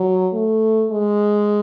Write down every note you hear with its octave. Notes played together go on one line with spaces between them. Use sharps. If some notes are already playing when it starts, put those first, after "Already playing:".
Already playing: F#3
A3
G#3